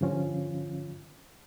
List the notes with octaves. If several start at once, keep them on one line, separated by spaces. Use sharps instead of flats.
G2 D3 F3 C#4 F4